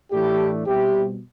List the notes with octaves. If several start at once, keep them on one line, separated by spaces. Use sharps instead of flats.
A2 E3 A3 D4 E4 G4
B2 G3 C4 E4 G4